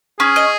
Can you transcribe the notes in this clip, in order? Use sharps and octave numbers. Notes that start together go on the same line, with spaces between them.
C#4 G#4
D#5